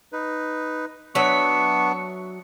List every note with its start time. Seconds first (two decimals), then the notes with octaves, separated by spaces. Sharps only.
0.13 D#4 B4
1.15 F#3 B3 D4 E5 C#6